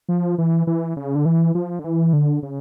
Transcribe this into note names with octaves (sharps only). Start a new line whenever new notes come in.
F3
E3
E3
C#3
D3
E3
F3
D3
E3
D3
C#3